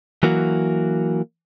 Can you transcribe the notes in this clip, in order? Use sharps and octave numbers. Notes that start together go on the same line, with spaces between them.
E3 F#3 A#3 F#4